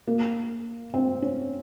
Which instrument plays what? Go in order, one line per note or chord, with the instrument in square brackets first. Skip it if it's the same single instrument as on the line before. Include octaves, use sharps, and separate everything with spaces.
[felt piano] A#3
C4
C#4